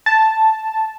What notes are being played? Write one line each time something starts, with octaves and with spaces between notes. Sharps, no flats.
A5